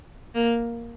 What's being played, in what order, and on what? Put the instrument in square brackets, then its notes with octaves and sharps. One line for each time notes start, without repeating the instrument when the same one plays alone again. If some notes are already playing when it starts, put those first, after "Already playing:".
[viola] A#3